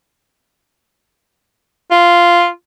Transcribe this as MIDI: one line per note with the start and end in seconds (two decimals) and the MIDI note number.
1.91 2.48 65